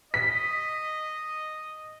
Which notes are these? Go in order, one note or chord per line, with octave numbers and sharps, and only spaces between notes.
D#5 B6